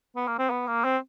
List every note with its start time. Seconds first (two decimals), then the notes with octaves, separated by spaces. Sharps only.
0.16 B3
0.28 A#3
0.39 C4
0.51 B3
0.68 A#3
0.84 C4